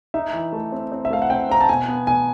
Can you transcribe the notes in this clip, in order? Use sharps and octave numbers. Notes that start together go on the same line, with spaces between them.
D#4 E5
E3
A3
C4
C4
E5
A3 F5
F#5
C4 G5
C4 A#5
A5
B2 G#5
B3
B2 G#5